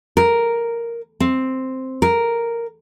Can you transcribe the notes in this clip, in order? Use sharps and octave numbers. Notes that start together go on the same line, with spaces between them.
A#4
C4
A#4